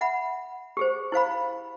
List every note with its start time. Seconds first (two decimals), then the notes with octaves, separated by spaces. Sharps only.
0.01 E5 F#5 B5
0.77 G4 G#4 C5
1.12 E4 C5 F5 B5